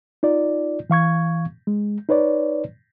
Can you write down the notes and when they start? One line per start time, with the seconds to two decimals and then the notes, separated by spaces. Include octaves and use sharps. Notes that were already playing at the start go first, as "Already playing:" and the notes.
0.23 D#4 F4 D5
0.90 E3 F5 C#6 G#6
1.67 G#3
2.09 D#4 B4 C#5 D5